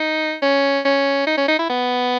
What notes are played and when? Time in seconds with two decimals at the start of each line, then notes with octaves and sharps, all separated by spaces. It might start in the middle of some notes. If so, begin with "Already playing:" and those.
Already playing: D#4
0.42 C#4
0.85 C#4
1.27 D#4
1.37 C#4
1.48 D#4
1.59 E4
1.70 B3